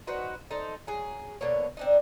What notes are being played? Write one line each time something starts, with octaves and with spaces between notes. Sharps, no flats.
D#4 F#4 B4 C5
D#4 A4 C5
F#3 G#4
B2 D3 A#3 C#5
C4 D4 D#4